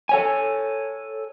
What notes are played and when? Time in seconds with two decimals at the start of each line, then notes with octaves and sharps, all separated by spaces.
0.09 A4 C#5 G#5